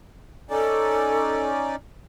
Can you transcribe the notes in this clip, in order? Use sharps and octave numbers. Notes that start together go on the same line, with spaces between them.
C#4 D#4 A4 D5